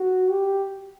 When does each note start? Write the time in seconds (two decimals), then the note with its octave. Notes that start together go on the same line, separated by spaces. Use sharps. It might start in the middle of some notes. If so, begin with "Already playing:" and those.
Already playing: F#4
0.30 G4